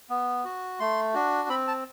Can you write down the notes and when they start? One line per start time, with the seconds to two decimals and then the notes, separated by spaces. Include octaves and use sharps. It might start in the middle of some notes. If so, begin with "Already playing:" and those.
0.10 B3
0.45 F#4
0.80 A3 C6
1.14 D4 F#4
1.49 C4 B5
1.68 A5